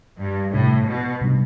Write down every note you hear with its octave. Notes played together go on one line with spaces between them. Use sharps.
G2
A2 C3 G3 D4
B2
C3 G3 D4